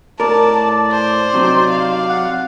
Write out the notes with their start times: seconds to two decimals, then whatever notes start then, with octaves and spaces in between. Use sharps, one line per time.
0.20 A2 A#4 D5 A5
0.92 C5
1.34 C3 F#3 D#4
1.70 F5
2.09 F#5